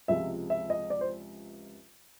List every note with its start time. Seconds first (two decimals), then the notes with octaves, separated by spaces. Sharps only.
0.08 C#2 C3 F3 G#3 E5
0.50 E5
0.70 D#5
0.90 D5
1.01 C5